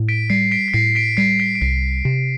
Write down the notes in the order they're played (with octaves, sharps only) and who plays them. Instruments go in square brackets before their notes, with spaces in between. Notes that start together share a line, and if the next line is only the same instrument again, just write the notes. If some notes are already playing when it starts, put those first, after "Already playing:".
Already playing: [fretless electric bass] A2
[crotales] B6 D7
[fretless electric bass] G3 [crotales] C7
[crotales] B6 D7
B6
[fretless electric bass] A2 [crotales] C7
[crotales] B6 D7
[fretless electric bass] G3 [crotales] C7
[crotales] B6 D7
D7
[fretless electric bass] C2 [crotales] C7
[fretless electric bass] C3